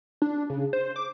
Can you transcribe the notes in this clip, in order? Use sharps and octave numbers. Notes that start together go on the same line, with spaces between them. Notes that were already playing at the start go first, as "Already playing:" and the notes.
D4
C#3
C5
D6